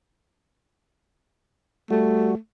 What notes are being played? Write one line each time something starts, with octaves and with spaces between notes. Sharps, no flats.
G3 A3 F#4